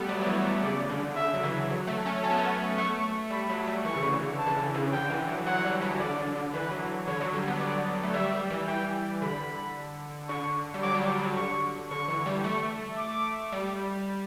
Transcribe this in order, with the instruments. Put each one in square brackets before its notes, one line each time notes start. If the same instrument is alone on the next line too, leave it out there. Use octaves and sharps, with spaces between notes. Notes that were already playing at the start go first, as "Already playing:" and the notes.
Already playing: [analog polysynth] G3 A3 B3
[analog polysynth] F#3 [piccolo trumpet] D5
[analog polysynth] F#3
E3
E3
[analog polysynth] C#3 [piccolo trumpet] D5
[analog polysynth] D3
[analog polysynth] D3 [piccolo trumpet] E5
[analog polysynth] F#3
E3
F#3
A3
C#4
[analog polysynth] C#4 [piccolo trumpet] A5
[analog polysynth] B3
A3
B3
[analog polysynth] A3 [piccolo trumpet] C#6
[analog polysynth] G3 [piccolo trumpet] B5
[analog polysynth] F#3
G3
[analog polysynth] E3 [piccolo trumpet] C#6
[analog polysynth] C#3
D3
C#3
[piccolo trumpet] A5
[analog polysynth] E3
D3
C#3
[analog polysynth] D3 [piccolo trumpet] G5
[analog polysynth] E3
F#3
[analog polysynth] F#3 [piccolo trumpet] F#5
[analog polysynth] G3
F#3
[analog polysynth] D3 [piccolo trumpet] D5
[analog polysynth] D3
D3
[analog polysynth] E3 [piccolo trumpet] B4
[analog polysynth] F#3
[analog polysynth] D3 [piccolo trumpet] C#5
[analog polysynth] F#3
G3
B3
[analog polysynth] B3 [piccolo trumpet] D5
[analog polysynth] A3
[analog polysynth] G3 [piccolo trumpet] E5
[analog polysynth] G3
E3
[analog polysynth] E3 [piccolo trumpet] G5
[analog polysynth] D3 [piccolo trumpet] B5
[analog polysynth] D3 [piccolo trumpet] C#6
[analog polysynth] G3
[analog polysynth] F#3 [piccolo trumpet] D6
[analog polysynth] G3
F#3
F#3
[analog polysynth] D3 [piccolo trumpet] C#6
[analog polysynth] D3 [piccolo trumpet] C#6
[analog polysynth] E3
G3
[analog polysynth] A3 [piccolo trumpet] C#6
[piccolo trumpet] D6
[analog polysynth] G3